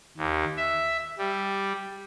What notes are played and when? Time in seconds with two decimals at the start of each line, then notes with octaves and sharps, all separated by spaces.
0.17 D#2
0.57 E5
1.18 G3